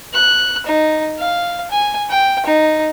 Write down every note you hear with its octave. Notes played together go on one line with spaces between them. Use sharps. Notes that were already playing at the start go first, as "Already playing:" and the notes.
F#6
D#4
F5
G#5
G5
D#4